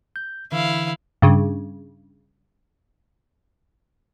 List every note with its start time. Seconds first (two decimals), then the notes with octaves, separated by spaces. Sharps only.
0.16 G6
0.52 D3 E3 E4 F5
1.22 G2 C#3